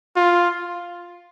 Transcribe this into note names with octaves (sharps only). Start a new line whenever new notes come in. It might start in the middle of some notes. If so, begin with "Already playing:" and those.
F4